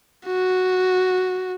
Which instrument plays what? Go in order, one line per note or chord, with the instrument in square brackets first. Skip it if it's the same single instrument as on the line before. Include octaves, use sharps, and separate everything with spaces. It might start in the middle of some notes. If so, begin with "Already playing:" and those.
[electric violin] F#4